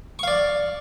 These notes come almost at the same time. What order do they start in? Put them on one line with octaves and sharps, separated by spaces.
C#6 F5 D5